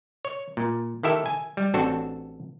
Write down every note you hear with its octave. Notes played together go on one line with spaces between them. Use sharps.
C#5
A#2
D#3 E4 G4 A4 E5
G#5
G3
A1 C4 D4 F#4 A4